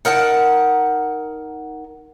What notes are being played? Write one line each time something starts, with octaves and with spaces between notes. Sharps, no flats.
D#4 A#4 F#5 A5